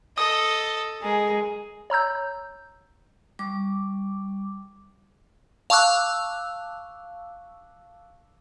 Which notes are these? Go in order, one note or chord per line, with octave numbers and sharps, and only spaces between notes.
A4 D#5 D#6
G#3 G#4 A#4
C#5 A#5 E6 G6
G3 D6
F5 A5 C#6 D6 E6 F#6